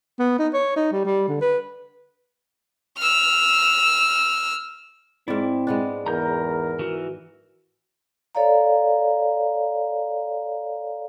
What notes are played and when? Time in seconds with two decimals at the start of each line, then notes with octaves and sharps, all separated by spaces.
0.19 B3
0.39 D#4
0.54 C#5
0.76 D#4
0.92 G3
1.05 G3
1.28 D3
1.41 B4
2.98 E6 F6
5.28 G#2 C4 E4 D5
5.67 G#3 B3 D4
6.06 E2 A#4 A#5 G6
6.79 E3 F#4
8.35 A4 C#5 D5 F5 A#5